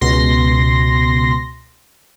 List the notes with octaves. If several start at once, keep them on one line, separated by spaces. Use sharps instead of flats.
C#2 B2 C6 A#6